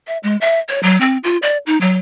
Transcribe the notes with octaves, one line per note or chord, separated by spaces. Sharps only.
E5
G#3
E5
C#5
F#3
C4
F4
D5
D#4
F#3